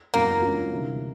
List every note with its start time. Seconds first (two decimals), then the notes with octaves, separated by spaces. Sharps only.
0.13 F#1 E2 C#3 F#3 A#3
0.42 G2 E3 G#3 C#4 F4
0.71 D2 C3 E3 G3